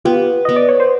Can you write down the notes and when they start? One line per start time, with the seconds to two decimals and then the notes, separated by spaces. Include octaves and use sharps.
0.05 B3 F4 G4
0.45 B3 D#5
0.56 D5
0.69 C#5
0.80 C5